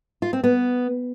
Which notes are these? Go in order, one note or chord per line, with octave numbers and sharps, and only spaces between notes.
F4
C4
B3